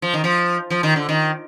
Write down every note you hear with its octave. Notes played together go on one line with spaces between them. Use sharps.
F3
D#3
F3
F3
D#3
D3
D#3